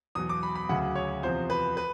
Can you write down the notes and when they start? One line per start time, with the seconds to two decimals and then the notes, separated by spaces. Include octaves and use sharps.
0.15 E2 B2 F#3 D#6
0.29 D6
0.43 B5
0.55 B5
0.69 D2 C#3 F#3 F#5
0.95 C#5
1.23 E2 C3 F3 C5
1.50 B4
1.77 B4